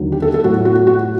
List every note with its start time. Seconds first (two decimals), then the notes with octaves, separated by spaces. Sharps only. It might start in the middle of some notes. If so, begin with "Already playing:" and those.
Already playing: D#2 D3 F#3
0.12 G4
0.22 A4
0.34 A4
0.44 A2 F#3 F#4
0.65 F#4
0.87 F#4